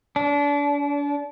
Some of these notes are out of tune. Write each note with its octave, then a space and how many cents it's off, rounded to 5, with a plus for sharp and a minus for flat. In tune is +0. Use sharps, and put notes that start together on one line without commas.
D4 -35